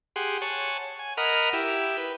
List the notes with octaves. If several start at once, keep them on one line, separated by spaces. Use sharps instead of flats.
G4 G#4 F#5 C6
C#5 F#5 G#5 A5
G#5
A#4 D#5 F#5 B5 F6
E4 G4
B4